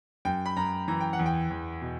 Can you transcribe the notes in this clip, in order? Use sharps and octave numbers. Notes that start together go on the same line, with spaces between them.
F#2 G5
B5
F#2 A#5
E3 A#5
G5
F#5
E2
G5
E2
B2